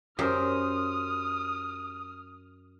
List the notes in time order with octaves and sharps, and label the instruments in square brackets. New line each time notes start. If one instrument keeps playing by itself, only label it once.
[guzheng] F#2 [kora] G4 A#4 C5 [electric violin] D#6 F6